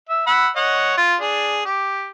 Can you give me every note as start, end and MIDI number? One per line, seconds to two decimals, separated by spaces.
0.09 0.22 76
0.27 0.49 78
0.27 0.49 83
0.27 0.49 88
0.56 0.95 73
0.56 0.95 75
0.56 0.95 78
0.97 1.15 65
1.20 1.65 62
1.20 1.65 68
1.65 2.10 67